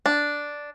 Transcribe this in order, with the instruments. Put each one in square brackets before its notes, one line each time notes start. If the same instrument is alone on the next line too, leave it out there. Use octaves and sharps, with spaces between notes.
[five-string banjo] D4